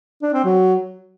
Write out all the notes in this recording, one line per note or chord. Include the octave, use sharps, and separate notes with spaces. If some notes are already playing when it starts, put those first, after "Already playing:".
D4
C4
F#3